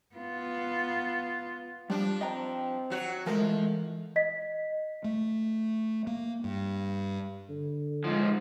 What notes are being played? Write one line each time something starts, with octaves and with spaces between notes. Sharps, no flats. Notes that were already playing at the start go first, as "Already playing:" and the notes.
B3 F4
F3 G3 D4
C4 D#5 G5 A#5
F#3 F#4
E3 F3 G#3 A3 A#4
D#5 B6
A3
A#3
G2
D3
G#2 F3